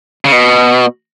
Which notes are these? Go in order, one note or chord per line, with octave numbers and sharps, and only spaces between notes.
C#3
B2